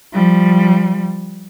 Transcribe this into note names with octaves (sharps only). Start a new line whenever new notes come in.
F3 G3